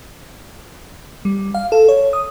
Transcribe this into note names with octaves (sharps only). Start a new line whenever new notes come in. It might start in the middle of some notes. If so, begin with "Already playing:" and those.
G3
F5
A4
C#5
D#6